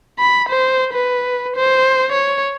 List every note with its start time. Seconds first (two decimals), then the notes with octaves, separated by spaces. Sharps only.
0.19 B5
0.49 C5
0.93 B4
1.56 C5
2.12 C#5